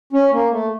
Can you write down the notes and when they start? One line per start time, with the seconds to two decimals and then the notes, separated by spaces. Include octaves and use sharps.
0.13 C#4
0.31 A#3
0.50 A3